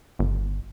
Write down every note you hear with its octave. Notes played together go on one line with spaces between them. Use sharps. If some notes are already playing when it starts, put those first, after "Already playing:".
G1